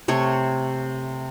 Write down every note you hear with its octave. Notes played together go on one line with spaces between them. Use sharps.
C3 A3 C#5